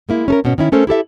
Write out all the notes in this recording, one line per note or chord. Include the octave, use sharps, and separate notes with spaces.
G#3 A#3 E4
C#4 A4 A#4
G#2 B2 B3 C#4
D#3 C#4 E4
A3 C#4 A4 A#4 C5
E4 G4 A4 E5